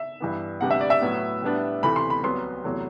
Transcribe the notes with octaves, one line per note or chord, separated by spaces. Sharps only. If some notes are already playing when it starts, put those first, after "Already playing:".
Already playing: E5
G2 E3 B3
D2 C3 G3 B3 D4 F#5
E5
D5
E5
A2 F#3 B3 E4
A2 G3 B3 D4
D2 C3 E3 A3 B5
C6
B5
C2 C3 F#3 B3 C6
E2 C3 F#3 A3 E4